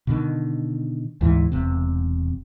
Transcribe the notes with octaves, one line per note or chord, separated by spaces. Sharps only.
B2 D3 D#3
D2 G#2 E3
E1 C3